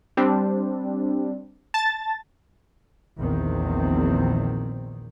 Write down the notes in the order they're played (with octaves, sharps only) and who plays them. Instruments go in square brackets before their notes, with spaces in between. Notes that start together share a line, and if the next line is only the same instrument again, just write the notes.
[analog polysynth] G3 C4 D4
A5 A6
[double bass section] A#1 E2 A#2 D#3 C4